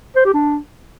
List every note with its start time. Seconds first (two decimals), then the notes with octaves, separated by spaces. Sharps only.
0.16 C5
0.25 G4
0.34 D4